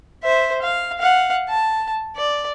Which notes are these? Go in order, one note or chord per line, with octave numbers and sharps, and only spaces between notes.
C5 E5
F5
F5 F#5
A5
D5